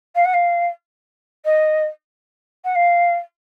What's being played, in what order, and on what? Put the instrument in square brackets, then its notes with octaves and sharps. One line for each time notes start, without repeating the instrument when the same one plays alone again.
[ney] F5
F#5
F5
D#5
F#5
F5